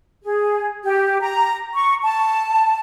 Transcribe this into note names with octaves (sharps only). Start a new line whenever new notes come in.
G#4
G4
A#5
C#6
A5